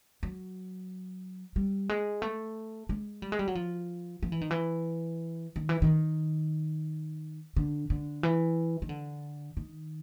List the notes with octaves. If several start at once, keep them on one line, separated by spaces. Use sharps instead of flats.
F#3
G3
G#3
A3
G#3
G3
G#3
G3
F#3
F3
F3
E3
D#3
E3
D#3
E3
D#3
D3
D3
E3
D#3
D3
D#3